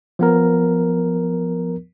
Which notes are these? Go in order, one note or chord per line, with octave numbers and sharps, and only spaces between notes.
F3 B3 A#4